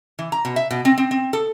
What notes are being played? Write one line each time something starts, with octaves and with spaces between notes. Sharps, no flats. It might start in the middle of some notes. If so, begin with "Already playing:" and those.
E3
A#5
B2
E5
B2
C4
C4
C4
A4